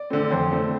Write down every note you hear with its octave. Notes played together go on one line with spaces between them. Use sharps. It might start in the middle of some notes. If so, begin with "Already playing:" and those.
Already playing: D5
D3 A3 C4
F2 C5
D3 A3 C4